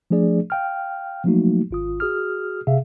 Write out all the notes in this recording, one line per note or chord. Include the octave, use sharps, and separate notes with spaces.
F3 A3 D4 G#4 D5
F5 G5 F6
F3 F#3 A3 A#3 D#4 F#4
G#1 F4 D#6
F#4 G#4 D#6 F6
C3 G#4 E5 F5